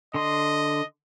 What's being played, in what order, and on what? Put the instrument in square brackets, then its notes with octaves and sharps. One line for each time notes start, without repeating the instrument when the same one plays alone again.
[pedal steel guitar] D3 C6 [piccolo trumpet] D#5